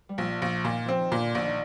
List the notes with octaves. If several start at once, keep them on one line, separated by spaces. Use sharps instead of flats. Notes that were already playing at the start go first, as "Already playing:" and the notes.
G3
A#1 F3
A#1
A#2 D#3
F3 C4
D#3
A#2 D3
A#1 D3
D#3